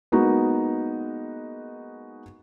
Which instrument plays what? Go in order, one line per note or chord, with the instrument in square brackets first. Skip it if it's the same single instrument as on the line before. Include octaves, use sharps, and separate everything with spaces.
[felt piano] G#3 A#3 B3 D#4 F#4